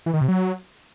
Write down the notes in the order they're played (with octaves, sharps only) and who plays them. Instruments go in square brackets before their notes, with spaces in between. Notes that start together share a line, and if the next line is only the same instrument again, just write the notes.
[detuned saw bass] E3
D#3
C3
F#3